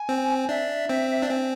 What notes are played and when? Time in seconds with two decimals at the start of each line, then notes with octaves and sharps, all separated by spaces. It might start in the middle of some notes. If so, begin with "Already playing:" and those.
Already playing: G#5
0.09 C4
0.49 D4 E5
0.89 C4
1.22 D4
1.29 C4 G#5